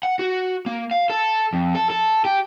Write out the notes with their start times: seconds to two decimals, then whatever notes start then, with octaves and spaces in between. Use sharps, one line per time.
0.03 F#5
0.19 F#4
0.66 A#3
0.91 F5
1.10 A4
1.53 F2
1.75 A4
1.90 A4
2.25 G4